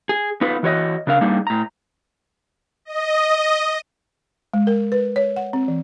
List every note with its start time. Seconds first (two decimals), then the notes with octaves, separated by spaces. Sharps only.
0.09 G#4
0.41 B3 D#4 F4 B4
0.63 E3 F#4 C#5 D#5
1.07 C#3 D4 A#4 F5
1.21 G3 A#3 D4 D#4 G#4
1.47 A2 A#5
2.85 D#5
4.54 G#3
4.67 A#4
4.92 B4
5.16 C#5
5.36 F#5
5.53 C4
5.68 E3